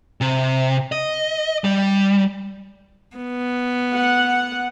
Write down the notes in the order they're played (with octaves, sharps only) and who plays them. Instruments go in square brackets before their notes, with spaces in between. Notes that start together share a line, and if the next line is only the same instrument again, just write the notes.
[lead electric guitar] C3
D#5
G3
[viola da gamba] B3
[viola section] F#5